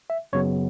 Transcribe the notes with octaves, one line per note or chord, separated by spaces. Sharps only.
E5
F#2 C#3 F#3 B3 C#5